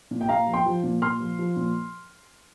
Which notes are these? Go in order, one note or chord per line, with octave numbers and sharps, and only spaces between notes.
A#2
G5
A#2 F5 A#5
F3
G5 C6
F3
A#2
A#2 C6 F6
F3
F3
A#2